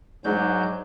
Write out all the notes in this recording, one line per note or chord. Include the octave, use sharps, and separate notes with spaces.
G#2 F#3 G#3 D4 D#4 G6